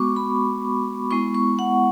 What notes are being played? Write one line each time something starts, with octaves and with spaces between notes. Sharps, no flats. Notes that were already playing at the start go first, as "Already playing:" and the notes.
Already playing: G#3 B3 F#4 C#6 D6
B5
G#3 B3 E4 C#6
C#6
F#5